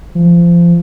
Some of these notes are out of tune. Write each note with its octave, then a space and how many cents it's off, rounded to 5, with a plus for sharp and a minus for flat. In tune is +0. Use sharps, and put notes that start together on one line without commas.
F3 -25